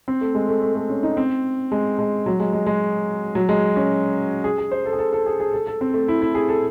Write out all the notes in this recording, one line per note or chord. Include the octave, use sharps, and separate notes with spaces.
C4
A3
G#3
A3
A3
A3
C#4
D#4
C4
G#3
G#3
F#3
G#3
G#3
G#3
F#3
G#3
C#4
G#4
G#4
C5
A4
G#4
A4
A4
G#4
G#4
A4
A4
C4
A3
E4
E4
G#4
A4